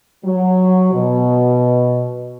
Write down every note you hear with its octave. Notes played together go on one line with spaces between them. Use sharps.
F#3
B2